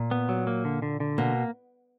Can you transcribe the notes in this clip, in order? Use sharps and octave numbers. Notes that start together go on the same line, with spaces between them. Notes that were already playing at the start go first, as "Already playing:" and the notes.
Already playing: A#2
B3
F#3
A#3
D3
D3
D3
B2 A#3